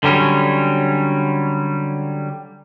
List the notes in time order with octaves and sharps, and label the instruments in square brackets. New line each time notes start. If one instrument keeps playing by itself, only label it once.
[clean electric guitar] D3 F#3 G3 C#4